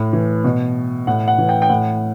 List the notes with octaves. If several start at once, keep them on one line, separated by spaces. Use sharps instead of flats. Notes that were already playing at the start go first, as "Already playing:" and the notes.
Already playing: A2
E3
B2
A2 F#5
F#5
E3
G5
G5
A2 F#5